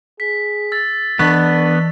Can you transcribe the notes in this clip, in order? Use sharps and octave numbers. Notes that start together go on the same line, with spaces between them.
G#4 B6
E6 A6
E3 B3 D4 C#6 B6